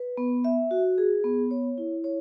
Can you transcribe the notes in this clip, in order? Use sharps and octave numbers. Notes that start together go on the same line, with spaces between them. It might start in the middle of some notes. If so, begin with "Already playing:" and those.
Already playing: B4
B3
E5
F#4
G#4
B3
C#5
E4
C#5